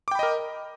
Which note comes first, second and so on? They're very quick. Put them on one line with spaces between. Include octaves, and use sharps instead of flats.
D6 G5 B5 D#5 A#4